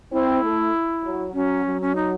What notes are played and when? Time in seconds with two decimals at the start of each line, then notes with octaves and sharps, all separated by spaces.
0.11 C4 E4
0.42 A3
1.03 F#3
1.34 F#3 C#4
1.64 F#3
1.81 C#4
1.95 D#4